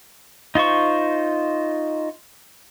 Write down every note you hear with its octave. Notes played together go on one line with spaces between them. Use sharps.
D#4 F4 C5 C#6